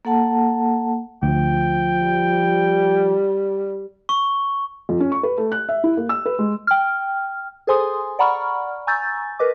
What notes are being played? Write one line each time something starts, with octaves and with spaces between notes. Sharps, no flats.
A#3 A4 F#5 A5
D2 F3 G5
G3
C#6
F2
C#4
C#6
B4
A3
F#6
E5
E4
A#3
E6
B4
G#3
G5 F6
G#4 A4 C5 G#5 C6 D#6
D5 F#5 A#5 B5 C#6 F6
G#5 A#5 C#6 E6 G6 A6
A#4 B4 D#5 D6